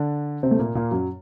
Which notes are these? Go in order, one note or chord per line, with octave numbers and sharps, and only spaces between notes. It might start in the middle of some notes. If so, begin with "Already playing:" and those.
Already playing: D3 D4
C3 C4
A3
A#2 A#3
A#2 A#3
F#2 F#3